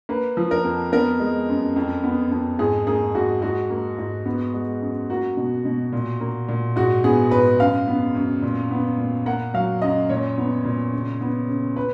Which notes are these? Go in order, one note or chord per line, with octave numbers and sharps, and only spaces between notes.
A#3 B4
F3
A#4
F2
B3 A#4
G#3
F#2
F2
B3
F2
G#2 G#4
A#3 G#4
G#2 F#4
G#2 F#4
A#3
G#2
B3
G#3
F#2
A#3 F#4
B2
B2
A#2
A#3
A#2
G#2 F#4
B3 G#4
G#2 B4
F#2 F5
B3
F#2
A#2
B3
A#2
A#3 F#5
F#3 F5
F#2 D#5
A#2 C#5
B3
A#2
C#3
B3
C#3
B4